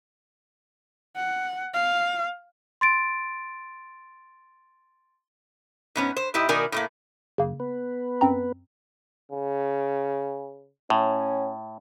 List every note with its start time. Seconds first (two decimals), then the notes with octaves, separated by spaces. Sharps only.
1.16 F#5
1.74 F5
2.81 C6 A6 D7
5.96 G#2 B3 C#4
6.17 C5
6.34 G#2 E4 G4 D#5
6.49 B2 D#3 D#4 A#4 D5 G#5
6.72 A2 A3 A#3
7.38 F#2 C#3 A#3
7.60 B3 B4
8.21 F#2 C4 A#5
9.31 C#3
10.90 A2 C#4